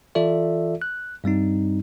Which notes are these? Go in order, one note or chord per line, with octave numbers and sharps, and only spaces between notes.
E3 F4 A4 D5 E5
F#6
G2 G3 C4 D#4